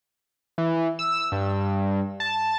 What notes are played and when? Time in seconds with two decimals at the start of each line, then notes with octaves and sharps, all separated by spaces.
0.58 E3
0.99 E6
1.32 G2
2.20 A5